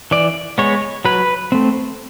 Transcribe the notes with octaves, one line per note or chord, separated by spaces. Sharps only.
E3 D5
G#3 B3 C#5
F#3 B4
A3 C4